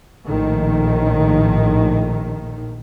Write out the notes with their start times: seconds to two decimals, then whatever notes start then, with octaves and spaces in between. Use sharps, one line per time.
0.28 A#1 A2 D#3